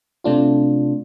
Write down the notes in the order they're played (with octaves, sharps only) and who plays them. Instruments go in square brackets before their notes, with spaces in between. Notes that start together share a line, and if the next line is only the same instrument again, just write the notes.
[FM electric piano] C3 A3 D4 F4